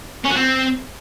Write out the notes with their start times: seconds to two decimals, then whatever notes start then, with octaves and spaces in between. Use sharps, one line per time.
0.25 C#4
0.30 F#4
0.36 C4